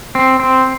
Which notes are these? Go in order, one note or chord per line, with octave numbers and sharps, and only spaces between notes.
C4
C4